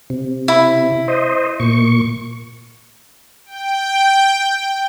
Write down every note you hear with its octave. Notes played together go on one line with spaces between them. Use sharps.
C3
E4
C5 D#5
A#2 C#6
G5